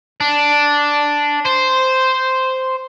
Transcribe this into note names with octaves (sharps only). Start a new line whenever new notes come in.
D4
C5